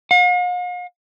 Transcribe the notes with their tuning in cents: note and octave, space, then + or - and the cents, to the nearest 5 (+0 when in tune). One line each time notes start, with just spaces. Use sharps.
F5 +45